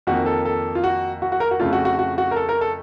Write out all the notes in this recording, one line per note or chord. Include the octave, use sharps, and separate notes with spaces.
F2 D#3 A#3 F#4
A4
A4
F4
F#4
F#4
F#4
A#4
F#4
F2 C#3 A3 F4
F#4
F#4
F#4
F#4
A#4
A4
A#4
A4